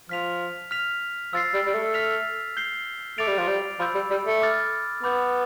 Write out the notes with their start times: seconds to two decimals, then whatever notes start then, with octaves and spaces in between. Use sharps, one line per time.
0.09 F3 F6 B6 F7
0.71 F6 B6 F7
1.33 F3 E6 A6 C7
1.54 G3
1.66 G3
1.74 A3
1.94 F6 B6 F7
2.57 G6 C7 G7
3.18 A3 D6 A6 D7 F7
3.28 G3
3.38 F3
3.48 G3
3.79 F3 B5 E6 G6
3.95 G3
4.11 G3
4.26 A3
4.42 D6 F6 A6
5.03 B3 B5 D6 G6